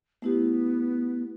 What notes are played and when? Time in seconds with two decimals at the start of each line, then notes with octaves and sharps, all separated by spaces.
0.22 A3 B3 E4 G4